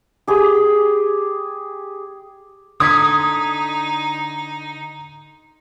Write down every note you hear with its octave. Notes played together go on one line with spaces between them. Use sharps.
G4 G#4 C6
D3 D#4 C6 D#6 G#6 B6